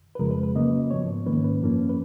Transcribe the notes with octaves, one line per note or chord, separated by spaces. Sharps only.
B4
F2 C#3 F3 G#3 A#4
B4
B4
C#3 F#3 A#3 C#4 D#5
G#2 F3 B3 C#5
G#2 D#3 A#3 C#4 B4
B4
F#2 F3 A#3 C#4
B4